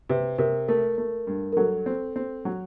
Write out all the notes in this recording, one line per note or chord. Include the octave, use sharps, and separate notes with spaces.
C3 B4
C3 A#4
A3 A#4
A3
G2
A#4
F#3 A4
C4
C4
F#3